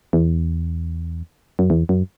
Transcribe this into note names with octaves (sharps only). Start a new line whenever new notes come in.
E2
F#2
E2
F#2